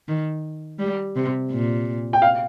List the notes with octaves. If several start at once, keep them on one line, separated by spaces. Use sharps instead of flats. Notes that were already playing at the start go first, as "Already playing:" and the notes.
D#3
G3
C3
A#2
G5
F5